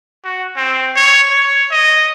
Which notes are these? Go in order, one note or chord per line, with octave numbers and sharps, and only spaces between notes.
F#4
C4
C#5
C#5
D#5